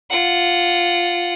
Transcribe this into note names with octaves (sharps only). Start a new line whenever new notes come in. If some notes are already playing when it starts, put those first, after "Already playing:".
F4 F#5